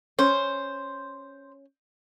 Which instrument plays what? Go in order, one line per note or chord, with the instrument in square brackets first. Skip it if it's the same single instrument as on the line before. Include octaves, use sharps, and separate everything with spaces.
[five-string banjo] C#4 [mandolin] C5